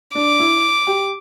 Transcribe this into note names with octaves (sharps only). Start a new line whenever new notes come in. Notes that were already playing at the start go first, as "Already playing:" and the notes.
D4 D6
E4
G4